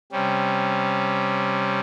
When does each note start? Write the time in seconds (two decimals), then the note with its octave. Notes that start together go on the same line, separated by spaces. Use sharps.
0.12 C3 G3 C#4